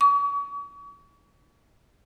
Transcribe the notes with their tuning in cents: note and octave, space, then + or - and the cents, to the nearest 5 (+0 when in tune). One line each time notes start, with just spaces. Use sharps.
C#6 +40